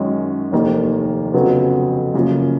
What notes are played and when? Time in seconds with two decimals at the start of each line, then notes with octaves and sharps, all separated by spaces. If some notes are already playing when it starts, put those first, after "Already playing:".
Already playing: F#2 D#3 G#3 C#4
0.52 F1 D#2 D#3 A#3
1.34 F1 F2 C#3 F#3 B3
2.14 F#2 C#3 F3 A#3